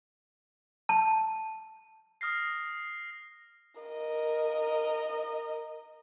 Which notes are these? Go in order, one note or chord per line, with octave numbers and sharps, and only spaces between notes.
A5
D#6 F6 A#6 C7
A#4 D#5